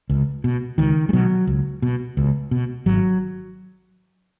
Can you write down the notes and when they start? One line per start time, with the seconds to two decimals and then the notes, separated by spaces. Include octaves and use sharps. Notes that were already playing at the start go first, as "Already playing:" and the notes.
0.10 C#2
0.44 B2
0.78 C#2 D#3
1.09 G#3
1.13 B2 F#3
1.47 C#2
1.82 B2
2.17 C#2
2.51 B2
2.86 G#1 F#3